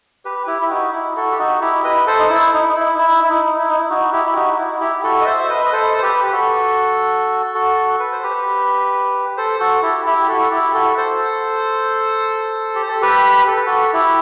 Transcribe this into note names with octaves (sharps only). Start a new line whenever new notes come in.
G4 B4
E4 G4
E4
D#4 F#4
E4
F#4 A4
G4
D#4 F#4
E4 G4
B4 D#5
A4 C5
D#4
E4
D#4
D#4
E4
D#4
E4
E4
D#4
E4
D#4
E4
D#4 F#4
E4 G4
E4
D#4 F#4
F#4
E4
E4 G4
F#4 A4
D#5
C5 E5
E5
B4 D#5
D#5
A4 C5
C5
G4 B4
G4
F#4 A4
F#4 A4
B4
C5
G4 B4
A4 C5
F#4 A4
E4 G4
E4 G4
G4
F#4 A4
E4 G4
F#4 A4
A4 C5
G4
A4
G4 B4
A4
B4
F#4 A4
E4 G4